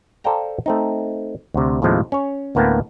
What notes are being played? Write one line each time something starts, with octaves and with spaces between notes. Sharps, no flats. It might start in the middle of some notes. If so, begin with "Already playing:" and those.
A4 C5 D5 F5 G5 A#5
A3 C4 D#4
D2 C3
D#2 A2 C3 F3 G#3 A3
C#4 C#5
D2 A2 A#3 B3 G5 A5